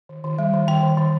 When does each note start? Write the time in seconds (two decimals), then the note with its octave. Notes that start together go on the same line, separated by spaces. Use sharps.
0.09 D#3
0.24 D#3
0.38 G3
0.53 D#3
0.68 D#3 G5
0.83 D#3
0.97 D#3